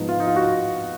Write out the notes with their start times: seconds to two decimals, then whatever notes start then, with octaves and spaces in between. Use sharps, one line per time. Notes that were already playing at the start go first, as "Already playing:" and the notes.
Already playing: G#2 F3 B3 D#4
0.09 F4
0.20 D#4
0.27 F4
0.36 F#4